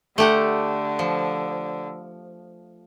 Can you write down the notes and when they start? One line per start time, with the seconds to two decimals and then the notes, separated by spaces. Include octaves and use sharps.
0.18 D3 A3 G4 F#5
0.99 F3